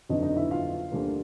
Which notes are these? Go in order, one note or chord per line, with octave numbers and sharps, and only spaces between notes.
G1 F2 D3 F#3 D#4 D#5
D#4 D#5
E4 E5
F4 F5
D2 D3 G3 A#3